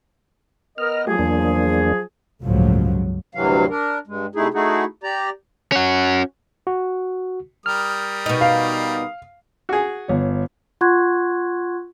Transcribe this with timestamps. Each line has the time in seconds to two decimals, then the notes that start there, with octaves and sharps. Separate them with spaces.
0.78 B3 A#4 D#5 F6
1.07 F3 F#3 A3 G4 G#4
1.19 E2 A#3 D4
2.43 G1 C#2 A2 F3 F#3
3.35 D2 G2 C3 E3 F#3 F5
3.70 D4 A#4
4.07 G2 G#3
4.35 C3 A3 D#4 E4 G#4
4.54 A3 D#4 E4 F#4 G#4
5.03 G4 D5 A#5
5.72 C#4 F#4
6.67 F#4
7.66 G3 A#4 D#6 F6
8.26 B2 D#4
8.41 F5
9.69 F#4 G#4
10.08 G1 C#5
10.81 F4 F#5 C6 C#6 F#6 G#6